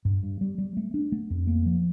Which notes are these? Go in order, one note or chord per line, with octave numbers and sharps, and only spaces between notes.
G2
G2
G3
G3
A3
D4
A3
F2
A#3
F3